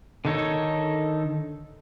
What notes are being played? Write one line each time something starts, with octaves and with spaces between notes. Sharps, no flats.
D3 D#3 D#4 A4 C#5